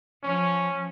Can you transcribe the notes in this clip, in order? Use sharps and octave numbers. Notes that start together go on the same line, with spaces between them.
F3 C#4